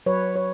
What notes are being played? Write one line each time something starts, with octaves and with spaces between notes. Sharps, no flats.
F#3 B4 C#5
C#5